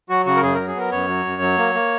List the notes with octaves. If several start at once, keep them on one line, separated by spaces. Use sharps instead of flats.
F#3 F#4
C#3 F#4
A#4
F#2 G#4
F#3 A#4
G#4
B3 A#4
F#2 C#5
F#3
F#2
F#3
A#3
A#3